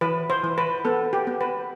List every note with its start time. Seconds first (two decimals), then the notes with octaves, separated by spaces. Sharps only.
0.01 E3 B4
0.30 C5
0.44 E3
0.58 B4
0.85 B3 A4
1.13 G4
1.27 B3
1.41 B4